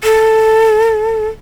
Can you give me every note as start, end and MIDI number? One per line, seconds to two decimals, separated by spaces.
0.04 1.27 69